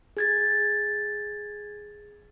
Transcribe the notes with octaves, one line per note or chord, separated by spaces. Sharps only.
G#4 G#6 A6